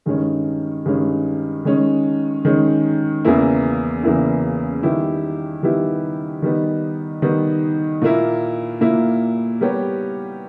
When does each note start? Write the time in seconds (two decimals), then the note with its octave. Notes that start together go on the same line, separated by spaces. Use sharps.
0.06 G2 D#3 G#3 C#4
0.85 G2 D#3 G#3 C#4
1.65 D#3 G#3 C#4
2.45 D#3 G#3 C#4
3.25 E2 C#3 E3 A#3 E4
4.03 E2 C#3 E3 A#3 E4
4.83 D#3 G3 B3 E4 G4
5.63 D#3 G3 B3 E4 G4
6.42 D#3 G3 B3 D#4
7.22 D#3 G3 B3 D#4
8.02 A#2 A#3 E4
8.81 A#2 A#3 E4
9.61 G3 B3 G4 A#4 C#5